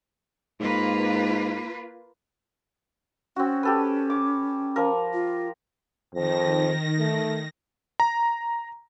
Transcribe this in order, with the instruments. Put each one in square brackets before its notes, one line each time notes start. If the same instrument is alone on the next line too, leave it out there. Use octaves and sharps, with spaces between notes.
[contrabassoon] G#2 [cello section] A#3 F4 B4
[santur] C4 F#4 [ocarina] C#4
[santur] G4 A4 B4
D6
F3 A#4
[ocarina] F4
[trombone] F2 [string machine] D#3 A#6
[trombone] A3
[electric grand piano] A#5